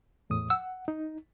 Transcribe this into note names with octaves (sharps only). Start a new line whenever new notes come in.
E2 A2 D#6
F#5 E6
D#4